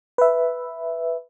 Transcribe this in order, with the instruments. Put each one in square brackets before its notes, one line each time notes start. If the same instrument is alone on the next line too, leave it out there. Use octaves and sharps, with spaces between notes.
[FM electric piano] B4 E5